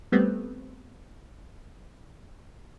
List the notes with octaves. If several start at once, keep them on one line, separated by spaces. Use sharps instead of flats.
G3 A3 B3 C4